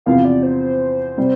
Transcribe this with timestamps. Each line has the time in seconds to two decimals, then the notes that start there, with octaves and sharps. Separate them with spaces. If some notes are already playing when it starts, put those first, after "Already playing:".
0.06 E2 C3 F3 F5
0.25 D5
0.43 C5
1.17 C3 G3